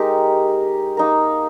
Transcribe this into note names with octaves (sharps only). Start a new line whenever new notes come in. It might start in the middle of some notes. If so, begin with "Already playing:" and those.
Already playing: G#3 D#4 G4 A#4
A#3 D#4 A#4